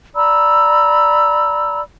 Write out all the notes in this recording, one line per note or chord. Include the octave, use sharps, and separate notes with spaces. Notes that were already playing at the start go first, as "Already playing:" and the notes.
D5 A#5 B5 E6